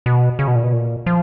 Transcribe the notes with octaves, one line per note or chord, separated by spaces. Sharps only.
B2
C#3
B2
A#2
B2
A#2
F3